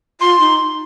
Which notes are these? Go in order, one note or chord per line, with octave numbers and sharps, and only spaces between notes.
F4 C6
D#4